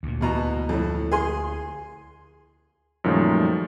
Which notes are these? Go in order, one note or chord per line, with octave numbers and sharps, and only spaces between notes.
D2 A#2
E2 B2 A#5
F2 A2
G#4 G#5 C6
F#2 A#2 D#3 F3 G3 A3